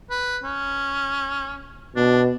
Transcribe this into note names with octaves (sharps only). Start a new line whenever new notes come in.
B4
C#4
B2 D4